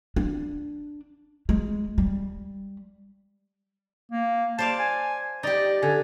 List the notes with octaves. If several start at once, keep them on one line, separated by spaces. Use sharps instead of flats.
D4
G#3
G3
A#3
C5 D5 F5 A5
G#5
D#4 G4 D5
D3 G#5